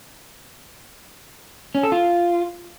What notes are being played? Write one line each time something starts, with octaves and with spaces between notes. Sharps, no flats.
C#4
A4
F4